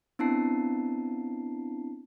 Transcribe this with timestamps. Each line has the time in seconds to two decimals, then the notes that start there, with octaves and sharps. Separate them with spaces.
0.19 B3 C4 D4 E4 A5 C7